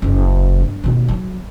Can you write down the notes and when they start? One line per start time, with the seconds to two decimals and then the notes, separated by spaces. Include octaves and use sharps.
0.02 F#1
0.59 G2
0.84 D#2 B2
1.08 F#3